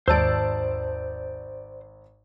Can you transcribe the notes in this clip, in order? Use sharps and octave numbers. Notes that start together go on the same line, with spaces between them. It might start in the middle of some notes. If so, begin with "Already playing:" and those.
G#1 D#2 C5 D5 A5 E6 D7